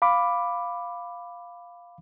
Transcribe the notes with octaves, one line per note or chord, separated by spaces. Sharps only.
F5 B5 D6